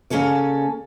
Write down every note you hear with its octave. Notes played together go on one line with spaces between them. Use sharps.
C#3 A#3 C#4 G#4 A4 D5